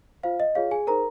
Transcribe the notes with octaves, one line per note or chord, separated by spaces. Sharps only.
F4 C5 F5
D#5
F4 G#4 C#5 F5
G#4 G#5
D#4 G#4 A#4 C5 A#5